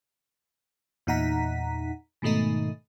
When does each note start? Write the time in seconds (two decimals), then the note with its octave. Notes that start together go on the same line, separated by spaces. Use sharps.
1.07 E2 A#2 D#4 F#5 A#5 B6
2.22 G#2 B2 D#3 A3 D#4